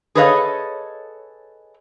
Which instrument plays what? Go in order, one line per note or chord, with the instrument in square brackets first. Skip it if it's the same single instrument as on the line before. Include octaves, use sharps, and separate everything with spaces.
[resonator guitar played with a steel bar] G#4 A4 B4 C#5 D#5 F5